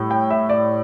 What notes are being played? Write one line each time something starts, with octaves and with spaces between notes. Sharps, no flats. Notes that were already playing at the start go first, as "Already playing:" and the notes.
Already playing: A2 G3
G5
E5
D5